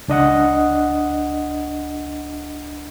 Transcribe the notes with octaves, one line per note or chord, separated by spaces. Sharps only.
C#2 D4 D#5 F#5